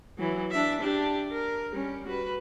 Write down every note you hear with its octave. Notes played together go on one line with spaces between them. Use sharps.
E3 F#3
D4 E5
D4 G4
A#4
G3 C#4
F#4 B4